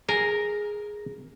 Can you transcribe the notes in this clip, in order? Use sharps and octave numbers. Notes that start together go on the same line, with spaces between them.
G#4 A#4